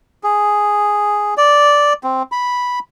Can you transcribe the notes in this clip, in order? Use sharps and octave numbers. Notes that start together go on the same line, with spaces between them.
G#4
D5
C4
B5